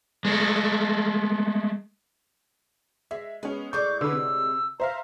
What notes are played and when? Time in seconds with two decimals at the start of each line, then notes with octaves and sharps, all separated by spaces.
0.25 G#3 A3
3.11 G#3 E5
3.43 G#3 B3 C#4
3.73 A2 G#3 D5 C#6 G6
4.01 D3 B4 E6
4.13 C3
4.80 C5 E5 F5 A#5